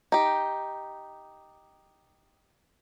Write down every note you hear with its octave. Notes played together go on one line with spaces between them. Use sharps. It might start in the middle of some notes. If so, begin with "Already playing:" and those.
D#4 G4